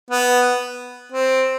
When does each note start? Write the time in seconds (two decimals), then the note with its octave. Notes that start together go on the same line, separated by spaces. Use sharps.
0.11 B3
1.12 C4